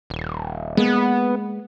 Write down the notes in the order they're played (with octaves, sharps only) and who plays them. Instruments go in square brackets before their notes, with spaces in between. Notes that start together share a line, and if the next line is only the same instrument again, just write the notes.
[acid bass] D#1
[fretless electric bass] G#3 A#3 [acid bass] B3